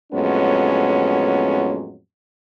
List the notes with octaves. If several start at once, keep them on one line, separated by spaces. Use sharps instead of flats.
F2 A2 F#3 G#3 B3 C#4